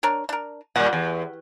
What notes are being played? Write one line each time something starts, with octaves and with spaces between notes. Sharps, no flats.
D4 A#4 C#5
D4 A#4
A#2 G3 F#5
E2